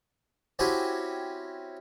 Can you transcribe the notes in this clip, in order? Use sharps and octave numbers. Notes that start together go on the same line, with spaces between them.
C4 C#4 E4 F#4 G4 G#5